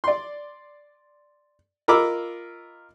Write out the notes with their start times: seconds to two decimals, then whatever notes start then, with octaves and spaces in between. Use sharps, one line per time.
0.04 D5 C6
1.88 F4 A#4 D#5 B5 D6 E6